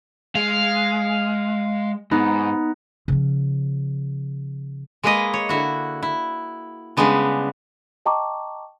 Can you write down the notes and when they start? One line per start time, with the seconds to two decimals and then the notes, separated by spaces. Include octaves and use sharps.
0.35 G#3 F5
2.11 G#2 B3 D#4
3.08 C#3 F3
5.03 G#3 A#3 G#4 B4 D#5
5.34 C#5
5.49 D3 E4 F#4
6.02 E4
6.97 C#3 G3 G#3 B3 D4
8.06 D#5 G5 A5 A#5 C#6 D6